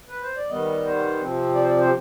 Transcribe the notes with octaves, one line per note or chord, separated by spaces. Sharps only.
B4
C5
D5
D#3 G3 B3 D#5
C5
C3 F3 C4
D5
C5
D5
C5
G4